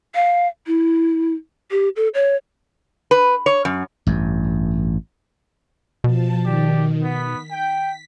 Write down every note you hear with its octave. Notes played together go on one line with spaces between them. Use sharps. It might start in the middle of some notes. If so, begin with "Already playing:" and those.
F5
E4
G4
A4
C#5
B4
C#5
F#2
A1 G2
B2 F3 A5
D#3 G4 D5
B3 B6
G5